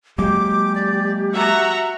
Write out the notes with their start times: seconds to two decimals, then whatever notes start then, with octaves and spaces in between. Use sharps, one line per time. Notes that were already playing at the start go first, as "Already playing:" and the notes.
0.18 F#3 G#3 A#3 G4 D6
0.75 D5
1.34 F#4 E5 F#5 A#5